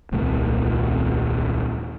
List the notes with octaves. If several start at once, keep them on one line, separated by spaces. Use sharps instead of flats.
D#1 C2 A3